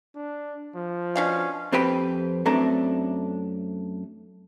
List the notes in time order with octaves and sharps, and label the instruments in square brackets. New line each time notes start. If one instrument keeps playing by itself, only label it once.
[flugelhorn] D4
F3
[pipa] B2 D4 F5 [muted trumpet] C#4
[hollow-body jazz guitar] F2 C4 G4 B4 G5 B5
F#2 A3 C4 D4 A#5